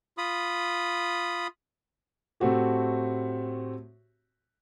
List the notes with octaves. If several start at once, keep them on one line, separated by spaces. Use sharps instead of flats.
F4 B5 D#6
A2 A3 C4 F#4 G4